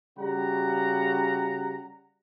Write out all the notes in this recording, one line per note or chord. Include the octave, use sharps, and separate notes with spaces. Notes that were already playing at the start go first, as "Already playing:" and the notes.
C#3 G3 F#4 F#5 A#5